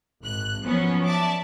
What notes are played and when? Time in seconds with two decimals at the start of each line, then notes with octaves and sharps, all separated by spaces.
0.24 G#1 F#6
0.63 F3 F#3 B3 C#4
1.06 D5 E5 A5 D6